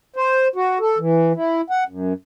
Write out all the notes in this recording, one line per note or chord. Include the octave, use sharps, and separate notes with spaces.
C5
F#4
A4
E3
E4
F#5
F#2